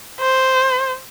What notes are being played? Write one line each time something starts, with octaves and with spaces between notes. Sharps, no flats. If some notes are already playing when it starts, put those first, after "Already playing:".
C5